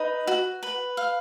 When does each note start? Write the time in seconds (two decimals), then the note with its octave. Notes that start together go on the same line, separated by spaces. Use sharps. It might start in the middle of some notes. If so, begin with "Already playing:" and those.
Already playing: D#4 B4
0.27 F#4
0.63 B4
0.97 F5